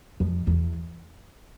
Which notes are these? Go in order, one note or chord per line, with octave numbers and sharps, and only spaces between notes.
F2
E2